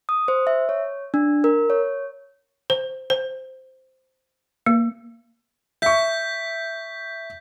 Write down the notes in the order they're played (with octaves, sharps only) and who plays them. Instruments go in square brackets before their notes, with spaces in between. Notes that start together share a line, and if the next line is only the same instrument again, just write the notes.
[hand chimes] D#6
C5
E5
C#5
D4
A#4
C#5
[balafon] C5
C5
A#3
[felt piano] E5 C#6 [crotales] G6 B6